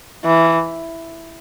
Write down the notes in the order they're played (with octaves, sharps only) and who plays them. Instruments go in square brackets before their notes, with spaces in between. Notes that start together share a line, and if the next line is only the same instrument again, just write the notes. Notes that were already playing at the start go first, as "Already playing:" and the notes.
[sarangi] E3